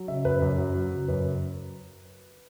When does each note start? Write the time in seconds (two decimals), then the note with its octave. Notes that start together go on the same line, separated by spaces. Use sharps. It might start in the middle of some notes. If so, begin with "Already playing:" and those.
Already playing: F#3
0.08 C#3 E5
0.25 F#2 B4
0.42 F#2
0.58 F#3
0.75 F#3
0.92 C#3
1.08 F#2 B4